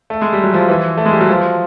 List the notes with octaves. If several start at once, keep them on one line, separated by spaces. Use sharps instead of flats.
A3
G#3
G3
F#3
F3
E3
A3
G#3
G3
F#3
F3